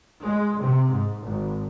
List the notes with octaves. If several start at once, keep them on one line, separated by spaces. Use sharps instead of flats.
G#3
C3
G#2
G#1